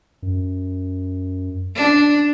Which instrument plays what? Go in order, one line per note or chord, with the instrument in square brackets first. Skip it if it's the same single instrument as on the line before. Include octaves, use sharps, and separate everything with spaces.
[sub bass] F#2
[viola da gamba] D4